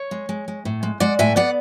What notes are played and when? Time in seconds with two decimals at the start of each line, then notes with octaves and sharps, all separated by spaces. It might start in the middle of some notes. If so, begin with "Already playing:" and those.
Already playing: C#5
0.11 G#3
0.29 G#3
0.48 G#3
0.65 A2
0.83 G#3
1.00 G#3 D5 F#5
1.19 A2 E5 G#5
1.36 B3 D5 F#5